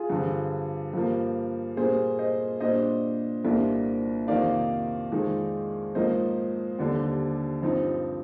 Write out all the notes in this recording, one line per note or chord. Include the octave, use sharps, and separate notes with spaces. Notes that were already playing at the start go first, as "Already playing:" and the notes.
Already playing: F4 G#4
G2 D3 F3
G2 F3 A#3
A#2 G3 A#3 G#4 C5
C5 D#5
A#2 G3 D4 C5 D#5
C2 A#2 G3 A#3 D4
F2 C3 D#3 A#3 D#4 D5 F5
F2 D#3 G#3 D#4
G#2 F3 A#3 D#4 C5 D#5
D#2 D3 G3 D4
G2 F3 C4 D#4